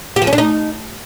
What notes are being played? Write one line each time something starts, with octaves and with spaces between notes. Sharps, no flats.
G4
F3
C#4
D4
D#4